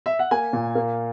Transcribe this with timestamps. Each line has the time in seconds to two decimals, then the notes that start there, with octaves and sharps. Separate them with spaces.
0.06 E5
0.19 F#5
0.31 A#3 G#5
0.53 A#2
0.75 A#3